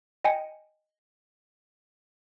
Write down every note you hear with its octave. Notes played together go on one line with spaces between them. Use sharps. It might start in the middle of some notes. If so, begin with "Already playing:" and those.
D#5 G5 G#5 C#7